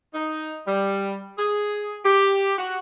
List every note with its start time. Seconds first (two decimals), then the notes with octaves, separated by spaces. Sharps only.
0.13 D#4
0.66 G3
1.37 G#4
2.03 G4
2.58 F#4